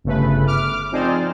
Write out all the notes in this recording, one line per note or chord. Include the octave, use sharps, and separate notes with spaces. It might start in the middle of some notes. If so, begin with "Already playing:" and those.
G1 C#3 A3 B4
D6 F6
F3 C4 D#4 G#4 C5 D5